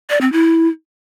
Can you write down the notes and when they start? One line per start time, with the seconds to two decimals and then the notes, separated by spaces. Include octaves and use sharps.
0.10 D5
0.21 C4
0.32 E4